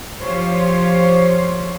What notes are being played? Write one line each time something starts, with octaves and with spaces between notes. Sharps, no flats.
F3 F4 G4 C5 C#5